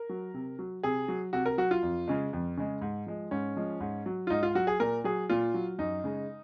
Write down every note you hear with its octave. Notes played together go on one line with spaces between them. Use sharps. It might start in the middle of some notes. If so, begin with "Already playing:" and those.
Already playing: A#4
F#3
C3
F#3
C3 G#4
F#3
C3 F#4
A#4
F#3 F#4
F4
F2
C#3 G#3
F2
C#3 G#3
G#2
F3 G#3
G#2 C#4
F3 G#3
G#2
F#3
F4
G#2 D#4
F4
F#3 F#4
G#4
A#2 A#4
F#3 G#4
A#2 F4
F#3
F#2 D#4
C#3 G#3